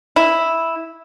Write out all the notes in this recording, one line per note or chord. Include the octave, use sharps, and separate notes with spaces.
E4